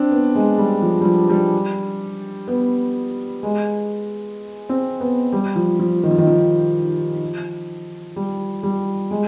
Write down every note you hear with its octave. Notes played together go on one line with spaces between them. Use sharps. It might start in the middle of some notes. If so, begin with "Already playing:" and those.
Already playing: C4 D4
B3
G#3
G3
F3
G3
F3
G3
B3
G#3
C4
B3
G3
F3
F3
D#3
F3
D#3
F3
G3
G3
G#3